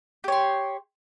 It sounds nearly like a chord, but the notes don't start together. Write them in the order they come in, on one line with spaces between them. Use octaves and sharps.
G4 C#5 C6